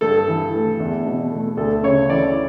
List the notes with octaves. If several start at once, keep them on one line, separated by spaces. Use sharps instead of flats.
G2 A4
E3
A3
E2
B2
A3
D2 A4
C#3 C#5
E3 D5